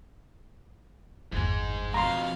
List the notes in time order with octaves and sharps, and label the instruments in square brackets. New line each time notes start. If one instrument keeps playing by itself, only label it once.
[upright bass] G1 E2 [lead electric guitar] G#2 G#3
[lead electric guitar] F2 B2 [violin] F5 [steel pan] A#5 C6